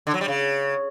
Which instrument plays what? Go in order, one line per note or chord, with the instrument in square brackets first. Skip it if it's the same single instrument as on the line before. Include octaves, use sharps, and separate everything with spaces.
[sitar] D3
F#3
G3
C#3